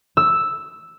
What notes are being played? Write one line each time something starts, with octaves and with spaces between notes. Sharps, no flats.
E6